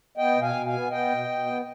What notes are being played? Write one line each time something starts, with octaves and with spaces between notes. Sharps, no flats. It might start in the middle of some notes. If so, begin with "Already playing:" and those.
B3 D#5 G5
B2
F5 G#5
B2
F5 G#5
B3
B3 D#5 G5
B2
B2
B3